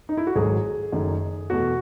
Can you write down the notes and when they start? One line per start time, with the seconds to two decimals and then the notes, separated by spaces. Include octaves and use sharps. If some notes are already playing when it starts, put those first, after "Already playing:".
0.09 D#4
0.17 E4
0.27 F#4
0.35 G#1 G#2 F#3 A3 G#4
0.92 F#1 F#2 D#3 A3
1.50 E2 B2 A3 F#4